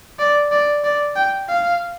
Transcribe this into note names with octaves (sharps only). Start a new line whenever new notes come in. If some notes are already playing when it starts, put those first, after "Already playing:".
D5
D5
D5
G5
F5